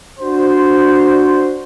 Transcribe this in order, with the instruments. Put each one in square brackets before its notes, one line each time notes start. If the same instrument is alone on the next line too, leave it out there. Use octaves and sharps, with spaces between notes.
[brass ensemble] D4 F#4 C5